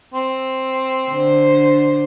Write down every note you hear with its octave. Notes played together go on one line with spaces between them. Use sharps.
C4
D3 C5